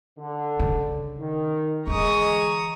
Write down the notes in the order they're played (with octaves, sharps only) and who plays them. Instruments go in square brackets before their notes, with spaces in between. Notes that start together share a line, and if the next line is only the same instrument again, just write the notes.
[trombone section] D3
[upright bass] C#3
[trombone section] D#3
[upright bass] D3 E3 [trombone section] G#3 [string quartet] A#5 C#6 D#6